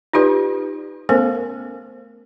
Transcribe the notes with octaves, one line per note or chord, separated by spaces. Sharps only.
D#4 F4 G4 B4 D5
A3 B3 C#4 A4 A#4 C5